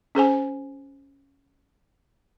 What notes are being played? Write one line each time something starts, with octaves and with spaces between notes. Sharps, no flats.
C#4 G#4 C5 G#5